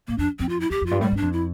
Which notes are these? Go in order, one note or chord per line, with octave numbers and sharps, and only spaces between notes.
A2 A#3
F2 D4
F2 C4
F4
E4
E2 G4
F2
G2 F4
A2 G3
G2
F2 D4
E4